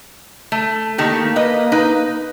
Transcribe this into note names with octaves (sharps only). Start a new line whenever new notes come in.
A3
D#3 A3 A#3 G4
B4 D#5
D#4 B4